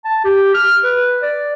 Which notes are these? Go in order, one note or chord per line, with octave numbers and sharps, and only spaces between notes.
A5
G4
F6
B4
D5